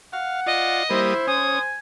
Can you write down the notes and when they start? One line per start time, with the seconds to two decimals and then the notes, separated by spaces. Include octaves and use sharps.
0.13 F5 F#5
0.46 F4 D5 D#5
0.90 G3 A#3 E4 C5 D#6
1.27 C#4 G#5 D#6